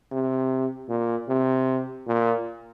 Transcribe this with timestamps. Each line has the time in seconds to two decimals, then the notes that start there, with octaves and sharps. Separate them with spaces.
0.12 C3
0.89 A#2
1.29 C3
2.07 A#2